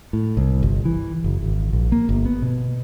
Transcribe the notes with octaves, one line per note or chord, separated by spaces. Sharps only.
A2
C2
G1
E3
F#1
G#1
A#1
A#3
G1
B3
B2